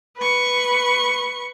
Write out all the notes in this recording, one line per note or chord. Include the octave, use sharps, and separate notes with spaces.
B4 C#6